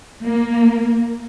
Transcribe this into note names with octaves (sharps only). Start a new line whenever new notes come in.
A#3